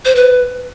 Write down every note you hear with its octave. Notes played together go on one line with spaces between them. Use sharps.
C5
B4